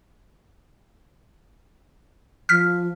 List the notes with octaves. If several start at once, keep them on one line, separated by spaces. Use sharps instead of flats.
F3 F6 B6